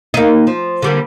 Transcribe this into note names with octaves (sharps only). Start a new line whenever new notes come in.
A#3 D#4
F3
D3 G3 A#3